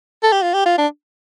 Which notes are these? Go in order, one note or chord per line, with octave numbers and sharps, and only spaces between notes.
A4
G4
F4
G4
F4
D4